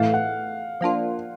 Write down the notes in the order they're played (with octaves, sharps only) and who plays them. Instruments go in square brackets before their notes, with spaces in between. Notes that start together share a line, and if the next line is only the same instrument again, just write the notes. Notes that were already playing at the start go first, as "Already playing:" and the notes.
Already playing: [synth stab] A2 E3 A3 [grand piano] F5
[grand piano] F#5
[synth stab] F3 A#3 D4 F4